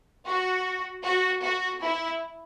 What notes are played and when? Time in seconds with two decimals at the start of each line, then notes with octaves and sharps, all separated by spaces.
0.27 F#4
1.04 F#4
1.43 F#4
1.82 E4